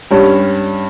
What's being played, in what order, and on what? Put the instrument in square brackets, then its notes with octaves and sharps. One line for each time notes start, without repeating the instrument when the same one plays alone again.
[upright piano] G2 G3 C#4